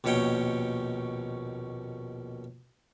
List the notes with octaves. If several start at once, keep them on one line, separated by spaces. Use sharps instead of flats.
A#1 D#2 B2 C#4 C#5 G5